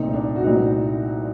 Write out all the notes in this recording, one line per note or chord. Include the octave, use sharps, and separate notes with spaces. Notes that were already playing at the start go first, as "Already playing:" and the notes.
Already playing: C2 A#2 A3 C4 D#4
D4
F#4
C2 A#2 A3 C4 D#4